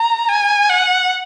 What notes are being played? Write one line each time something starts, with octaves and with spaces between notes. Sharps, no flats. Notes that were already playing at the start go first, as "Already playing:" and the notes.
Already playing: A#5
G#5
F#5